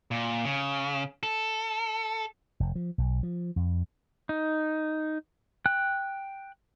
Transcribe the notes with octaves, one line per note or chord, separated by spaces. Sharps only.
A#2
C#3
A4
F1
F3
B1
F3
F2
D#4
G5 F#6